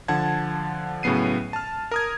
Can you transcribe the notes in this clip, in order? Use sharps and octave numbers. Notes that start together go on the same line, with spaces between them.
D3 F3 F#5 A5 G#6
A2 C#3 F#3 B3 C7 D#7
A5 F6
A#4 D#6 G#6